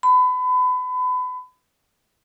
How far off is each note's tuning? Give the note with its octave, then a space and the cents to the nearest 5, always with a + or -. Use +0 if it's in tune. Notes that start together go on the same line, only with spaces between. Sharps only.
B5 +30